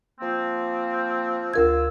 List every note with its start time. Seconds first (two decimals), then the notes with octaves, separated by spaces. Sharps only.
0.20 F3 A#3 C4
1.54 D2 F4 A#4 E6 G#6